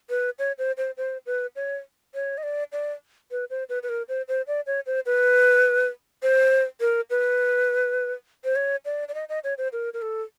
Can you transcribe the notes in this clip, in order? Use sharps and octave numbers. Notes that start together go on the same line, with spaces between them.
B4
C#5
C5
C5
C5
B4
C#5
C#5
D#5
D5
D5
B4
C5
B4
B4
A#4
C5
C5
D5
C#5
C5
B4
C5
A#4
B4
C5
C#5
D5
D5
D#5
D#5
C#5
C5
A#4
A#4
A4